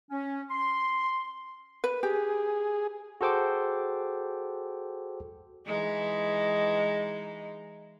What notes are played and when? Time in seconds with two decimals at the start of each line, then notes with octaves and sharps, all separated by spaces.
0.11 C#4
0.50 C6
1.84 B4
2.03 G4 G#4
3.21 F#4 G#4 A4 C5 G5 D6
5.66 E3 G#3 D#4